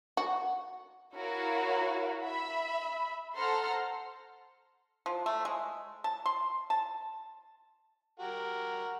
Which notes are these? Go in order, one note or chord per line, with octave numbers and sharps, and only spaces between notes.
F#4
E4 F#4 A#4 C#5 F5
E5 B5
A4 C5 F#5 A#5 C6 F6
F3
A3
G#3
A5
C6
A5
F#4 G4 A#4